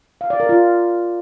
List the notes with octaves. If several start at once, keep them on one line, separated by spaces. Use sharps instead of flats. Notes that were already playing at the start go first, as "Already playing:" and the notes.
F5
D5
A#4
F4